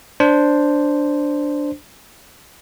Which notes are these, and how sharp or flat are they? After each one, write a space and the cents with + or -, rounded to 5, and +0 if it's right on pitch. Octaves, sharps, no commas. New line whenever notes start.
D4 +0 C5 +0